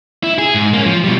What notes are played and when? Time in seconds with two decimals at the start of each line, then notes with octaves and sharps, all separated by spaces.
0.23 E4
0.38 G#4
0.55 G#2
0.74 A#3 C#4
0.85 F3
1.04 B2 G3